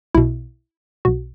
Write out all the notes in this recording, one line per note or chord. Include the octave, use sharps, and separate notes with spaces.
B1 B2 E4
B1 B2 F#4